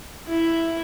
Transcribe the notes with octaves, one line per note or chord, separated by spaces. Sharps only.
E4